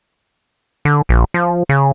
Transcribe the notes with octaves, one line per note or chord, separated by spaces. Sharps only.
D3
A#1
F3
C#3